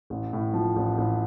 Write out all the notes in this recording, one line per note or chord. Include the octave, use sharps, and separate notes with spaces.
A1
A2
F3
A1
A1